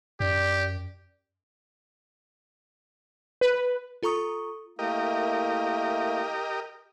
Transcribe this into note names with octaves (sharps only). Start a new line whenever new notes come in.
F#2 G4 D5
B4
F4 A4 A#5 C#6 D#6
A3 A#3 E4 G4 A#4 D#5